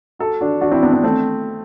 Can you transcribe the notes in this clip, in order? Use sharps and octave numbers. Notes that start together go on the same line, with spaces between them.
F#4 A4
D4 F#4
D4 F#4
C4 E4
B3 D4
B3 D4
A3 C4